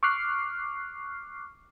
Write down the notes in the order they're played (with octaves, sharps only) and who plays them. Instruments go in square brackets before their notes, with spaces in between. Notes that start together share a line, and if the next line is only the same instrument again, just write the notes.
[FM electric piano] C#6 D6 F6 F#6 C7